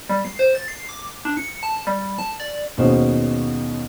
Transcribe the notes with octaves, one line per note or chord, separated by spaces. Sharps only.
G3
C7
C5
A6
C7
D6
D4
C#7
A5
G3
A5
D5
D#2 B2 G#3 C#4 F#4 C5